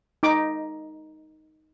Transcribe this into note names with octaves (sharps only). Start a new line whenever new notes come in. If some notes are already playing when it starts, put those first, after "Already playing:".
D#4 D6